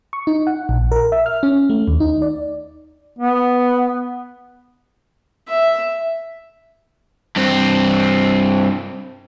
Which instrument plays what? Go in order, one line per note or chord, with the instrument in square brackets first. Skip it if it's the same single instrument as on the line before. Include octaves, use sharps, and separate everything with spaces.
[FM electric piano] C#6
D#4
F#5
A#1
A#4
E5
F6
C#4
A3
D#2
D#4
D5
[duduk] B3
[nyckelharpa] E5
[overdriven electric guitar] G2 C4